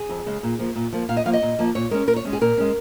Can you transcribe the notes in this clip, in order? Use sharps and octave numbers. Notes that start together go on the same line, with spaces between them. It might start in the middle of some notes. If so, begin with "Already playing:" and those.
Already playing: G#4
F2
C#3 G#3 C#4
A#2
F3 A#3
A#2
F3 A#3
A#2 F5
D#5
F3 A#3 F5
D#5
A#2
F3 A#3
A#2 C#5
G#3 C#4 A#4
A#2 A#4
C#5
G#3 C#4
G#4
A#2 A#4
G#3 C#4